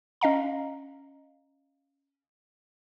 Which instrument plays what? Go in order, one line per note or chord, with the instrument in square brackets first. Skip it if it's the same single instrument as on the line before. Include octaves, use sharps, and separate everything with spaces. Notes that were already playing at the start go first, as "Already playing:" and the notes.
[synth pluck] C#4 D#5 F5 A#5